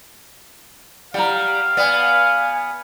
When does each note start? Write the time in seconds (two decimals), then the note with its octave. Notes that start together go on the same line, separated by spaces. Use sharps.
1.14 G3 F5 F#5 A#5
1.77 B3 D5 G#5